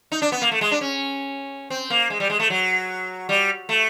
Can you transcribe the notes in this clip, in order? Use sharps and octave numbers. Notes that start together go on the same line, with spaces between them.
D#4
D4
B3
A#3
A3
G#3
D4
C#4
C4
A#3
G#3
G3
G#3
A3
F#3
G3
A3